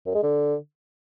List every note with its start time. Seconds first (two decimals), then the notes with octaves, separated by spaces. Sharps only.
0.06 F#2
0.15 G#3
0.23 D3